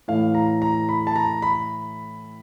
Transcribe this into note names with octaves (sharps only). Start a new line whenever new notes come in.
A2 E3 A3 F5
A#5
A#5
B5
A5
A#5
B5